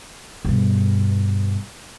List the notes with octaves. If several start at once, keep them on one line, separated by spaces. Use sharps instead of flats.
G2 B2